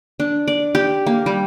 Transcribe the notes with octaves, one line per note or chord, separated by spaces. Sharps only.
D4
D5
G4
A#3
G3